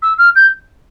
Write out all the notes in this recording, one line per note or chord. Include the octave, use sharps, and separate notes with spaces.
E6
F6
G6